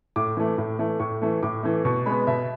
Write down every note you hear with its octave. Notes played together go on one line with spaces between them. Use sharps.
A2 D6
E3 A3
A2
E3 A3
A2 C#6
E3 A3
A2 D6
E3 A3
B2 C#6
G#3 B3 B5
B2 E5